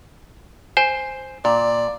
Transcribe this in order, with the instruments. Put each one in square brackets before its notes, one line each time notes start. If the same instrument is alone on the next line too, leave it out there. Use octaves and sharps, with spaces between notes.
[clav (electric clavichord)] C5 [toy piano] G#5
[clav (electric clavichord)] A#2 [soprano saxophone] D5